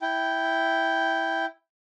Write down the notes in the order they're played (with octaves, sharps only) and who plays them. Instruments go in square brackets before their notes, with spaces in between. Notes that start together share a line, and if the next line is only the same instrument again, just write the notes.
[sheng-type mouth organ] E4 G5